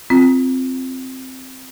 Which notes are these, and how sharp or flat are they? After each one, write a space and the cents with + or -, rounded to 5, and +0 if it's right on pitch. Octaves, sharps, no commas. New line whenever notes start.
C4 +0 F4 +0